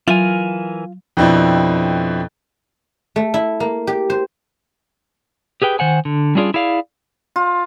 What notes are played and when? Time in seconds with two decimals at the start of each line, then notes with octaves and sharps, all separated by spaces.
0.08 E3 F#3 F4 A#4 G#5
1.17 F2 B2 C4 D4 E4
3.16 A3
3.34 E4
3.60 A#3
3.87 G4
4.10 C5
5.62 G4 G#4 B4 G5
5.79 D#3 C5 F#5 G#5
6.05 D3
6.35 G3 C#4 D4 F4 G#4 D5
6.54 E4 G#4 D5 F5
7.36 F4